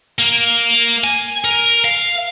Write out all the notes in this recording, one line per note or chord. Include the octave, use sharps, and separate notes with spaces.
A#3
G#5
A#4
F5